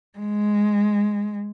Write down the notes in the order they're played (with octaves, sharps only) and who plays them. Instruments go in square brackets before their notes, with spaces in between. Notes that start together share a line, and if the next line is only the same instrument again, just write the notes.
[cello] G#3